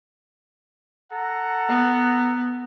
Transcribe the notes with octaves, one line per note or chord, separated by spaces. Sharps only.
A4 F#5 A#5
B3